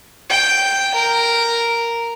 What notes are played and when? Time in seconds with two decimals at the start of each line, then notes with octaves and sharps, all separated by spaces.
0.30 G5
0.94 A#4